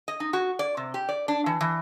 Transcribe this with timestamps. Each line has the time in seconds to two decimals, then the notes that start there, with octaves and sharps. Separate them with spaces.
0.08 D#5
0.20 D#4
0.33 F#4
0.59 D5
0.77 C3
0.94 G4
1.09 D5
1.28 D4
1.46 E3
1.61 E3